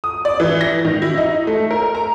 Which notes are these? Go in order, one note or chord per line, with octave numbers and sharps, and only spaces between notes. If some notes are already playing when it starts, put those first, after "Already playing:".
D#6
D5
E3
A#6
D#3
E4
D#4
A3
A#4
A#5